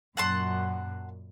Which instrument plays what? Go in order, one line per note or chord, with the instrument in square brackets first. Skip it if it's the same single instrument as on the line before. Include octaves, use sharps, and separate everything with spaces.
[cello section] F#2 A#2 [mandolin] F#5 A5 C6